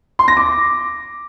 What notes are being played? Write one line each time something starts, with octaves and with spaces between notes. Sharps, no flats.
C6
A#6
D6